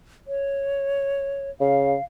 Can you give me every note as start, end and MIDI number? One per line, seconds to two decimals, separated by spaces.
0.27 1.50 73
1.61 1.95 49
1.61 2.03 77